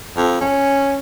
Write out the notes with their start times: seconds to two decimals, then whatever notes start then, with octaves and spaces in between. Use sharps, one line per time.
0.17 F2
0.41 C#4